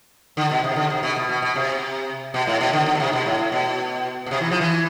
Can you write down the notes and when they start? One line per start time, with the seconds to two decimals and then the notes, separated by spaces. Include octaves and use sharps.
0.37 D3
0.51 B2
0.64 C3
0.76 D3
0.90 C3
1.03 B2
1.16 B2
1.29 B2
1.42 B2
1.55 C3
2.34 B2
2.47 A2
2.61 B2
2.73 D3
2.86 D3
2.95 B2
3.00 C3
3.13 B2
3.26 A2
3.39 A2
3.52 B2
4.26 B2
4.31 C3
4.41 E3
4.51 F3
4.61 E3